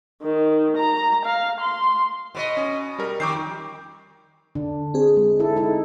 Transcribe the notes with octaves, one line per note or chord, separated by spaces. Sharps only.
D#3
A#5
F5
C6
B2 B4 D#5
C#4
G3 A#4
F2 D#3 D6 G6 C7
D3 D4
C4 G#4
G#3
E4 A4
D#4 E4 A4